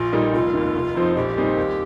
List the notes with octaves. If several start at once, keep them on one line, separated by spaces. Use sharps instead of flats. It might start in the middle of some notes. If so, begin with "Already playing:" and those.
Already playing: A#1 F4
A#2 G3 A#3 D#4
F1 F4
D#2 D#3
F1
F2 F3 C4 D#4
A#1 G4
A#2 G3 C4 D#4
D#2